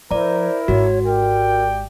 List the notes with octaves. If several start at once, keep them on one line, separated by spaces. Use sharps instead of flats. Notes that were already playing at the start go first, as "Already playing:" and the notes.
F3 E4 A#4 C5 D5 A#5
G#1 G#2 F#4 C#5
G4 A#4 D5 G5